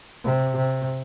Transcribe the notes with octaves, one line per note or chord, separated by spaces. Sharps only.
C3
C3